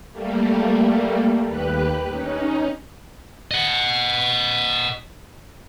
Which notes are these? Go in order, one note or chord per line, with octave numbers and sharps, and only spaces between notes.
G3 A3 A#3
D#2 G4 B4 F#6
C#4 D#4
D#5 F#5